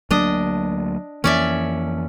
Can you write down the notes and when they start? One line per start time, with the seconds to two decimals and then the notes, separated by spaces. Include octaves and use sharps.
0.11 D2 F#3 A#3 D4 D#5
1.24 F2 E3 A#3 C#4 D5 E5